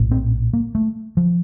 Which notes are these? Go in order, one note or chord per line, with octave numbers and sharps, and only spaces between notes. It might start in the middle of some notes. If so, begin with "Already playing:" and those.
Already playing: A#1 A2
C4
A#3
A3
F3